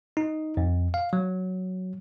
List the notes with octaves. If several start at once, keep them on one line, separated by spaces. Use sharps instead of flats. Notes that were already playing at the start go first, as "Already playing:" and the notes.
D#4
F2
F5
F#3